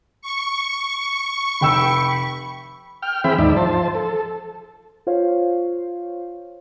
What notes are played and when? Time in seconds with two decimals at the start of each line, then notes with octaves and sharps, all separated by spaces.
0.22 C#6
1.61 F1 G5 B5 E6
3.02 G5 F6
3.24 E3 C4 G#4 E5 G5 B5
3.39 D#2 G#2 E3 D#4 D5 E5
3.56 F3 C5 A5
3.95 A4
5.07 F4 C5 C#5 F5